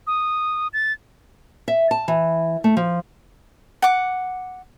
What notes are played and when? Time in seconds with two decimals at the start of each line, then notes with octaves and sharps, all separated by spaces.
0.07 D#6
0.73 A6
1.68 E5
1.91 A5
2.08 E3
2.64 A3
2.77 F3
3.82 F#5 D6